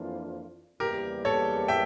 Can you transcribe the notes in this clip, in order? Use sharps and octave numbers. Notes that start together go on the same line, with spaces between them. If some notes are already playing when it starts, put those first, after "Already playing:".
Already playing: F2 E3 A#3 D4 F4
E2 C#3 E3 G3 A#3 G4 A#4
A4 C#5
E5 G5